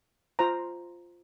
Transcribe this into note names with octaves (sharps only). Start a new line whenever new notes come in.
F4 C5 A#5